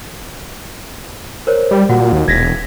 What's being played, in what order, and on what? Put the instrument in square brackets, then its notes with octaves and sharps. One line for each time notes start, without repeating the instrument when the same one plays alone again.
[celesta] A#4 C5 C#5
[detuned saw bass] G3
[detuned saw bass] A#2 [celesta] F4 F#4 F#5
[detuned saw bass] D#2
[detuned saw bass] E1 [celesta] G#6 A#6 B6